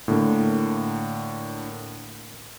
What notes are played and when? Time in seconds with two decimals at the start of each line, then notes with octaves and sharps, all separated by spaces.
0.08 A2 D3 A#3